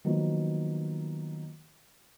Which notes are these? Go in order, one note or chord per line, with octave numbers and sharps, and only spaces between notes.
D#3 F3 F#3 A#3 B3